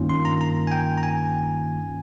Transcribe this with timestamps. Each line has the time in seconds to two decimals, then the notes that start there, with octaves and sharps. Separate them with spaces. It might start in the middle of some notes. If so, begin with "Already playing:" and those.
Already playing: G2 D#3 A#3 C#4 F4
0.09 C6
0.25 A#5
0.41 A#5
0.67 G#5
0.71 G5
0.98 A#5
1.03 G#5